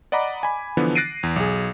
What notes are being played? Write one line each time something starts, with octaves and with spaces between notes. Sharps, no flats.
D5 D#5 F#5 A#5 B5 D6
G#5 B5
D3 E3 F3 B3 D4
F#6 A6 A#6 C7 D7 D#7
E2
B1 G#4